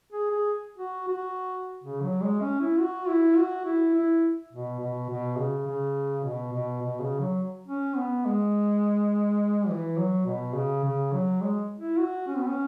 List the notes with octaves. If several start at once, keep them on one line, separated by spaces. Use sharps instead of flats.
G#4
G#4
F#4
F#4
C#3
F#3
G#3
C#4
E4
F#4
E4
F#4
E4
E4
B2
B2
B2
C#3
C#3
B2
B2
B2
C#3
F#3
C#4
B3
G#3
E3
F#3
B2
C#3
C#3
F#3
G#3
E4
F#4
C#4
B3
C#4